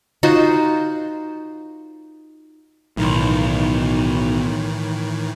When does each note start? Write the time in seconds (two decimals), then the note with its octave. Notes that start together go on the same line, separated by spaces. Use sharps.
0.23 D#4 F4 F#4 C5
2.97 B1 A2 D#3 E3